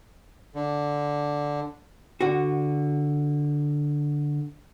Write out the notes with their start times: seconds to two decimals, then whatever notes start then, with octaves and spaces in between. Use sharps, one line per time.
0.55 D3
2.21 D3 F#4